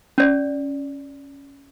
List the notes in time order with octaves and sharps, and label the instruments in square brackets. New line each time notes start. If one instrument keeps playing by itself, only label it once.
[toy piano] C#4 D5